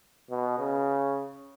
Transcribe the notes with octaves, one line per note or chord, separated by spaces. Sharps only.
B2
C#3